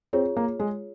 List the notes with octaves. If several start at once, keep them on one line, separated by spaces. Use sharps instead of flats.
C4 F4 G#4 C#5
A#3
G#3